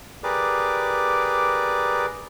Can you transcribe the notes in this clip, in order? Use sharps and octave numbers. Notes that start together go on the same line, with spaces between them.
G4 G#4 A#4 B4 D5 D6